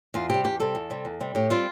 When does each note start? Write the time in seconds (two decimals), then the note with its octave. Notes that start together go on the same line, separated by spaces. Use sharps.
0.14 E2 F4
0.29 C3 G3 G4
0.44 E2 G4
0.60 C3 G3 A4
0.75 E2
0.90 C3 G3
1.05 E2
1.20 C3 G3
1.35 A2 G4
1.50 G3 C4 F4